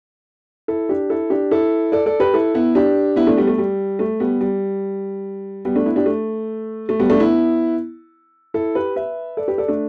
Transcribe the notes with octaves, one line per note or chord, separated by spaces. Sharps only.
E4 A4
D4 G4
E4 A4
D4 G4
E4 A4
A4 D5
A4 D5
G4 B4
E4 A4
B3 E4
D4 G4
B3 E4
A3 D4
G3 B3
A3
G3
A3
G3 B3
G3
G3 B3
A3 D4
B3 E4
D4 G4
A3
A3
G3 B3
A3 D4
B3 E4
E4 A4
G4 B4
B4 E5
A4 D5
G4 B4
A4 D5
A3 D4